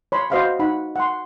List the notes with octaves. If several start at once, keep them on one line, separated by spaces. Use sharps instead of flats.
C#5 B5 C6
F#4 C5 D#5 F5 F#5 B5
D#4 F#5 B5
F#5 C6